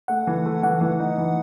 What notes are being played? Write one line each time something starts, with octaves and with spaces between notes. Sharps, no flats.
A3 F#5
E3
A3
E3 F#5
E3
D#4
E3